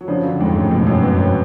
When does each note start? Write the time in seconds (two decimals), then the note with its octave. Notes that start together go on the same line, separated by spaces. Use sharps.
0.01 F#3
0.08 C#3 F3 D4
0.24 D3 F#3
0.39 F2 G#2 G#3
0.55 F#2 A2
0.71 F2 G#2 B2
0.87 F#2
1.03 F2 B3
1.18 F#2